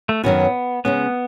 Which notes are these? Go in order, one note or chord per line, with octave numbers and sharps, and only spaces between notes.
A3
F#2 D#3 F#3 B3 C#4 F#4
C#3 G#3 B3 C#4